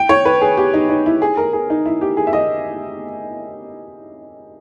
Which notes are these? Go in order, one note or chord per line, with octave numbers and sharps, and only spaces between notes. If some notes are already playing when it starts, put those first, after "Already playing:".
Already playing: G5
C#5
B4
G#4
G4
D#4
D#4
E4
G#4
A#4
G#4
D#4
E4
G4
G#4
E5
D#5